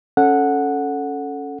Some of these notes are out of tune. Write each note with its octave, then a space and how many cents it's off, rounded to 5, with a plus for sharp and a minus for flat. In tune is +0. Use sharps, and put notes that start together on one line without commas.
C#4 +0 A4 +0 F#5 -10